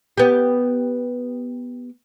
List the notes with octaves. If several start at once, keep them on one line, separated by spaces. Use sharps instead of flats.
B3 G4